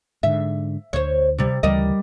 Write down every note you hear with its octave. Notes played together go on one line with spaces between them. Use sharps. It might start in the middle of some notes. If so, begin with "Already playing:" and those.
G#2 D3 E5
D2 C5 C#5
C3 G3
D2 C#3 E3 G3 A#4 D#5